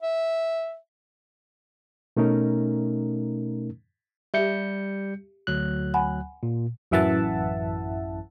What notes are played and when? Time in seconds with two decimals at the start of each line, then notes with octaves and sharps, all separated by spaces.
0.02 E5
2.17 B2 A3 C#4 D#4 A#4
4.34 G3 G4 E5 G6 C#7
5.47 D2 F#3 F#6
5.94 F#5 G#5 B5
6.43 A#2
6.91 A1 F#2 E3 E5 F#5 A5